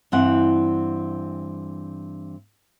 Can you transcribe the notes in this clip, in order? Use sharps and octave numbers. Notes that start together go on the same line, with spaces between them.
G2 E3 C4 F#5